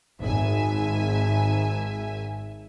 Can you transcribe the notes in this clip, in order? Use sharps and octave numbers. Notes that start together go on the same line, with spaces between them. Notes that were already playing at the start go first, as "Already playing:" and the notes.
G#1 E5 G#5